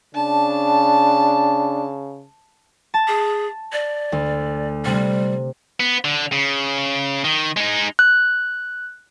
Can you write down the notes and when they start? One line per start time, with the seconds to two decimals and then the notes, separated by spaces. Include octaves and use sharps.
0.15 C#3 D4 A5
2.94 A5
3.08 G#4
3.73 D5
4.12 D2
4.85 C3 G3
5.80 B3
6.04 D3
6.32 C#3
7.24 D#3
7.57 G#3 D#4
7.99 F#6